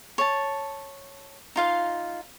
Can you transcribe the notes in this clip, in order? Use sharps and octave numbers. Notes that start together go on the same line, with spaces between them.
C#5 A5
D#4 F4 F5